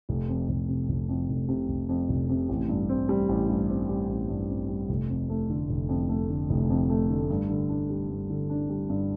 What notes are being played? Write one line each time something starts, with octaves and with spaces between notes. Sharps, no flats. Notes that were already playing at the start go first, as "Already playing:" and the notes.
F1
F2
F1
C3
F1
F2
F1
C3
F1
F2
F1
C3
A1
G2
C4
G3
A1
G2
C4
G3
A1
G2
C4
G3
F1
F2
A3
D3
F1
F2
A3
D3
F1
F2
A3
D3
G2
D3
D4
G3
G2
D3
D4
G3
G2